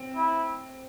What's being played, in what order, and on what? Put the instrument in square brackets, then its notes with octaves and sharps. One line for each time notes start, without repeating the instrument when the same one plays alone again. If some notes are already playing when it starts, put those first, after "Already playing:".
Already playing: [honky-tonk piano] C4
[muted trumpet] E4